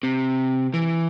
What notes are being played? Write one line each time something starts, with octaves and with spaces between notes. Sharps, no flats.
C3
E3